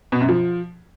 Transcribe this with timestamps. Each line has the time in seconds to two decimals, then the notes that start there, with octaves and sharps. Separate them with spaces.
0.12 B2
0.20 F#2
0.29 F3